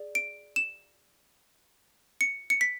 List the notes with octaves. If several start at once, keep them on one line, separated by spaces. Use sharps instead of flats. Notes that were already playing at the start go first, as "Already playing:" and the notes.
Already playing: G#4 D5
D7
E7
C#7
C#7
B6